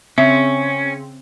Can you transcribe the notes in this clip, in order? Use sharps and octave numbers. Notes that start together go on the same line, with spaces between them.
C#3 C4 C#4 E5